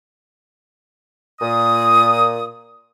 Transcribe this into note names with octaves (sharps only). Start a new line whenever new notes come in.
A#2 D#6